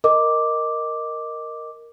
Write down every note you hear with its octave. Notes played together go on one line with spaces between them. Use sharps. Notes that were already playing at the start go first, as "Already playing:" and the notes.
A#4 D#5 D6